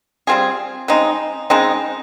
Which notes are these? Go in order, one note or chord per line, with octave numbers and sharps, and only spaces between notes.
G3 C4 F4 G#4
C#3 G#3 C4 D#4
C#3 G#3 C4 D#4